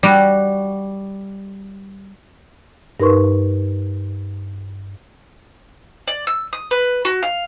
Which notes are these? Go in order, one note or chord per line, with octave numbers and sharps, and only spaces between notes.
G3 F#4
G2 D#4 A#4 B4 C6 C#6
D5
E6
D#6
B4
F#4
F5